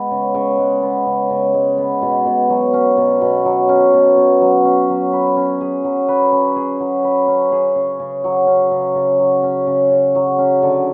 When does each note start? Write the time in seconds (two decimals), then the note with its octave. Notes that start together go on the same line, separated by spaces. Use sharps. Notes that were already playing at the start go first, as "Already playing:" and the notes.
Already playing: G#3 B3
0.11 C#3
0.35 C#3
0.59 G#3
0.82 B3
1.06 C#3
1.30 C#3
1.54 G#3
1.78 B3
2.02 B2
2.26 B2
2.49 F#3
2.73 C#4
2.97 B2
3.21 B2
3.45 F#3
3.69 C#4
3.93 B2
4.17 B2
4.41 F#3
4.65 C#4
4.89 F#3
5.13 B4
5.36 C#4
5.61 G#4
5.84 F#3
6.08 B4
6.32 C#4
6.56 G#4
6.80 F#3
7.04 B4
7.28 C#4
7.52 G#4
7.76 C#3
8.00 C#3
8.24 F#3
8.47 C#4
8.71 C#3
8.95 C#3
9.19 F#3
9.43 C#4
9.67 C#3
9.91 C#3
10.15 F#3
10.39 C#4
10.63 D3